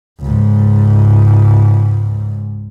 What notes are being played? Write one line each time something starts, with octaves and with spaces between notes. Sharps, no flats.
C#2 G#2